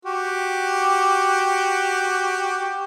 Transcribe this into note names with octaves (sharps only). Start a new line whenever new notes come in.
F#4 G4